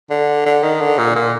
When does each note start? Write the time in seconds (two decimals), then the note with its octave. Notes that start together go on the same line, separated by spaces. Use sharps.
0.10 D3
0.46 D3
0.63 D#3
0.81 D3
0.98 A#2
1.16 A#2